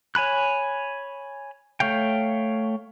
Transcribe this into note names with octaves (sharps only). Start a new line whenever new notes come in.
C#5 G#5 B5 F#6
A3 C#5 F5 G5